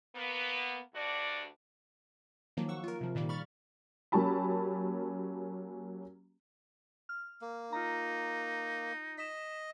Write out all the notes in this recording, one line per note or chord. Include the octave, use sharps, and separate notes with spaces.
A#3 B3
D2 G2 D4 F#4 D5
D#3 F3 F#3 A#3
F#5 C#6 E6
F4 A#4
C3 F3
A#2 D#3 G3 A#3
B5 C#6 F6 A6
F#3 A#3 C#4 G4 A5 B5
F6
A#3
D#4 F4 A#5
D#5 B6 E7